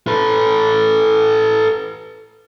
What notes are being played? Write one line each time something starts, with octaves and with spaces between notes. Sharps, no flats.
A4 B4